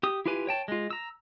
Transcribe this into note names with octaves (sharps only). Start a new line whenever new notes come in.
G4 D#6
E4 F4 G4 B4 G#5
C#5 G5 A5
G#3 F4
A#5 E6